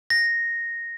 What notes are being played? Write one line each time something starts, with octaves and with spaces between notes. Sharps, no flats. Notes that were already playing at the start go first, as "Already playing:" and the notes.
A#6